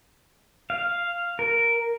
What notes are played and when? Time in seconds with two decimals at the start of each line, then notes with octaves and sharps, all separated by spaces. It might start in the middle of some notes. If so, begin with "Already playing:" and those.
0.70 F5
1.39 A#4